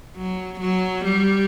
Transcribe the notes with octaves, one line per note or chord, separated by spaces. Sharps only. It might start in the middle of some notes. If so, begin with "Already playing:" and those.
F#3
F#3
G3